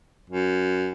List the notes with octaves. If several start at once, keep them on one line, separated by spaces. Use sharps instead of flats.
F#2